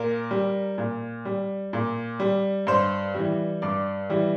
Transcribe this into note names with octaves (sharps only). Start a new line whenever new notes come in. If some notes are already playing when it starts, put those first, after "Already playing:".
Already playing: A#2 A#4
G3
A#2
G3
A#2
G3
G2 C5
E3 G3
G2 D5
E3 G3